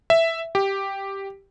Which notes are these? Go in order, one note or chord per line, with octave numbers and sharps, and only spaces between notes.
E5
G4